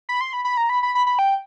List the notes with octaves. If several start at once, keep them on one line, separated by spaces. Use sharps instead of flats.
B5
C6
B5
B5
A#5
B5
B5
B5
B5
G5